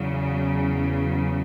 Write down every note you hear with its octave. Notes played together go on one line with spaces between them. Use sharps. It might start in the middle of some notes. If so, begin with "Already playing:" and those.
Already playing: E2 C#3 F#3